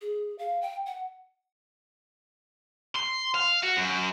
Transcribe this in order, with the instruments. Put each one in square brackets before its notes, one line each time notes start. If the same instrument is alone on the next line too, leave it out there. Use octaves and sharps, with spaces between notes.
[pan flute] G#4
F5
G5
F#5
[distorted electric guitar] C6
F5
F#4
F#2